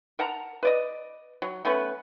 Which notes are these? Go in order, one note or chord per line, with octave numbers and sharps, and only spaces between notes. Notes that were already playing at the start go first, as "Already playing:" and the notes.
A#4 F#5 A5 A#5
B4 D5 D#5
F#3
A3 B3 C#4 B4